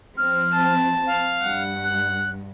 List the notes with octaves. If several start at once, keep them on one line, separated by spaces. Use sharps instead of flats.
F3 C4 F6
A5
F5
G2 F#5
F#6